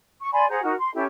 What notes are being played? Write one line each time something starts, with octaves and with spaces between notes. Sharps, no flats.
C#6
D5 G#5 B5 C6
G#4 C5 F#5 A#5
D#4 F#4 A#4
C6
C#4 E4 G4 A4